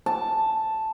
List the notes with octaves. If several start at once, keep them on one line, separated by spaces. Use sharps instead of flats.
A5